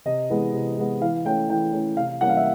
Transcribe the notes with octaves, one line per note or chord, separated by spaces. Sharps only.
C3 D#5
E3 G#3 B3
C3
E3 G#3 B3
E3 F5
A3 C#4 G5
E3 G5
A3 C#4
C3 F5
E3 G3 A#3 C#4 F#5
F5
E5